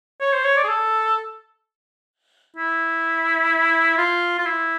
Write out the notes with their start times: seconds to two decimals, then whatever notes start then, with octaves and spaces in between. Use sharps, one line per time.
0.21 C#5
0.33 C5
0.44 C#5
0.57 D5
0.64 G#4
0.68 A4
2.57 E4
3.98 F4
4.38 F4
4.46 E4